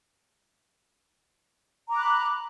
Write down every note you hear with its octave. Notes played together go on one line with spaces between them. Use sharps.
A#5 B5 D6 F#6